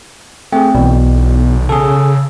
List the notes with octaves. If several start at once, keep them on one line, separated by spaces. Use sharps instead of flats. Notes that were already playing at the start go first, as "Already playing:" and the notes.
A3 C4 G#4 G5
B1 B2 E3 D5
C#3 G#4 A4 E6